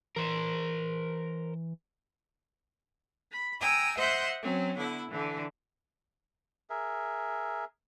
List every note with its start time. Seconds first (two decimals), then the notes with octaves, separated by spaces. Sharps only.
0.16 E3 A#4 C5
3.31 B5
3.60 G5 G#5 A#5 D#6 E6
3.96 C5 D#5 E5 F#5 C6 G6
4.41 F#3 C4 C#4
4.77 D3 B3 E4
5.10 D3 E3
6.70 G#4 A#4 E5